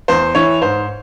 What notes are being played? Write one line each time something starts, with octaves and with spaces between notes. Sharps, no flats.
E2 C5
E3 C#5
G#2 C5